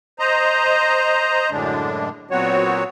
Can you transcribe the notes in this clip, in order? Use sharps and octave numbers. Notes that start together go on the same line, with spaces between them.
C5 D#5 A#5
F#2 A2 D3 G#3 D4
A#2 F#3 B3 C4 F#4 C#5